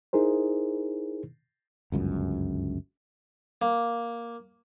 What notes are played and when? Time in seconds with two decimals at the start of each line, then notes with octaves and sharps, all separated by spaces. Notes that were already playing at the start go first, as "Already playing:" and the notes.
0.13 D#4 E4 G#4 A#4 C5
1.92 G1 C#2 F#2
3.62 A#3